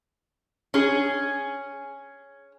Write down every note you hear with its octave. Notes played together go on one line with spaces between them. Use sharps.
C#4 G#4